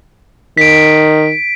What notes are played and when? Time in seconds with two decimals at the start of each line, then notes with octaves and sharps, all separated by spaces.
0.57 D#3 B6 D7